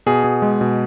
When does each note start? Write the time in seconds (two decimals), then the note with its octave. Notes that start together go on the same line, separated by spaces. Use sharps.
0.06 B2 G#4
0.24 B2
0.42 G#3
0.61 B2